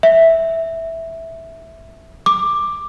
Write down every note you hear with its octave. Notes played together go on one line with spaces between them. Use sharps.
E5
D6